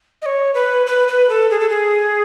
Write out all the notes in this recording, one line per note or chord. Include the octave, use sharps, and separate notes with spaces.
D#5
C#5
B4
B4
B4
A4
G#4
A4
G#4